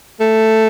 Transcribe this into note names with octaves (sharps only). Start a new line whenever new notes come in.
A3